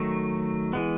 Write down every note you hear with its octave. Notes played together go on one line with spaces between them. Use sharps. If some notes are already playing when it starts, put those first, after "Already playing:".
Already playing: D#3 F#3 A3
E3 G#3 B3